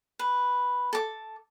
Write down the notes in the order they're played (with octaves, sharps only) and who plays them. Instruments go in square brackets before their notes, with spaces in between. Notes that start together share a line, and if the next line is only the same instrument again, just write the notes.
[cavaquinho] B4
A4 D6